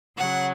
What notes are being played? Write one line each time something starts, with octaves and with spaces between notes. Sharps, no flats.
C#3 F#3 F#5